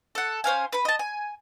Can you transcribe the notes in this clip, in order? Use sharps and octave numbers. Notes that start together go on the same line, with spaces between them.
A4 F#5
C#4 C5 F5 G#5
B4 B5
D#5 A5
G#5